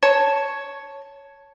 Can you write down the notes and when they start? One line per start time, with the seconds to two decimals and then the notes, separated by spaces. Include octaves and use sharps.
0.03 C#5 A5